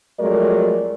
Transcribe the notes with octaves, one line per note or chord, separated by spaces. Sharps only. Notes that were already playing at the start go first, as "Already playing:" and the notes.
F2 F#3 G#3 A3 A#4 D5